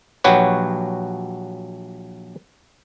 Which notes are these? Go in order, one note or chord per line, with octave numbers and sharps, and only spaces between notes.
A#1 F#3 F#4 G4 B4 C#5